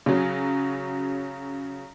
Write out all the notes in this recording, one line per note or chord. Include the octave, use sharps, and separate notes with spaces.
C#3 F#3